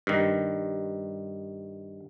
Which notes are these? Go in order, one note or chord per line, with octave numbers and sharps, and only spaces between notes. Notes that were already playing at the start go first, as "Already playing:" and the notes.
G2 D#3